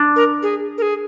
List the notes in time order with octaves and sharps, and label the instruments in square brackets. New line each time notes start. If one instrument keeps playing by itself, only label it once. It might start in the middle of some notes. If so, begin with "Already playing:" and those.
Already playing: [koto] D4
[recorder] A#4
G#4
A#4
G#4